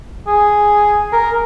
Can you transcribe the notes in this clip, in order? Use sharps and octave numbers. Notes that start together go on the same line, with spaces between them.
G#4
A#4